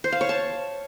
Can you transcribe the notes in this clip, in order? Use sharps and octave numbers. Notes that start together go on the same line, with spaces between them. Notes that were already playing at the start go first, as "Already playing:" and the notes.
C5
F5
C#5
A5